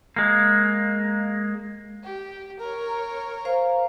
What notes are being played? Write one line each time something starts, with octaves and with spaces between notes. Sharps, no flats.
G#3 A#3
G4
A#4 C#5
C5 F5 A#5